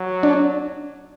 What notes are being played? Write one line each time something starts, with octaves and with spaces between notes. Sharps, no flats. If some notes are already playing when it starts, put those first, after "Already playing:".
Already playing: F#3
D4